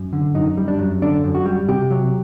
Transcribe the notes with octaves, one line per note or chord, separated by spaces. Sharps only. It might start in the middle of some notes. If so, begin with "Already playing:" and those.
Already playing: F#2
D3
F#2 D#4
G3
D4
F#2
D3 D4
F#2
F#4
G3
C3 G4
F#3